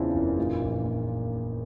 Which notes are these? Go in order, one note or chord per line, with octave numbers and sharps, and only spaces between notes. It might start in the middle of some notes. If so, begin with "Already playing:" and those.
Already playing: E2 C#3 E3 C4 D4 E4 F4
F#1
A#2 D#4 F4
A#1
A#2